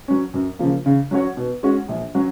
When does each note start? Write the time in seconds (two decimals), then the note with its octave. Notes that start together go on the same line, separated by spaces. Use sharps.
0.08 F#3 C#4
0.34 F#2
0.59 C#3 F3 A#3
0.86 C#3
1.11 F#3 C#4 F#4 C#5
1.37 B2
1.63 G#3 C#4 F#4
1.88 A#1
2.15 F#3 C#4 F#4